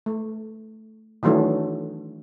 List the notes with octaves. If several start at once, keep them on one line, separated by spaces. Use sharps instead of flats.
A3
D#3 E3 F#3 A3 D4